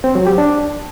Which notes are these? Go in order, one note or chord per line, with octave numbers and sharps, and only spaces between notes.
C4
F#3
G4
D4